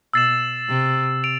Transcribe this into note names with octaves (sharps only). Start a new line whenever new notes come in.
B2 E6 A6 C7 E7
C3
D7 F7